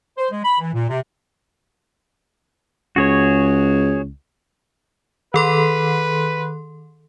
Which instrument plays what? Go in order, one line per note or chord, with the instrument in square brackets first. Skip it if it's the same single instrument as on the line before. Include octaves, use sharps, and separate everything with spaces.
[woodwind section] C5
G#3
B5
E3
A#2
C3
[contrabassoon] C#2 [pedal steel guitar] F#4 G#4 C#5
[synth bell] D#3 A4 C6 [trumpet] B4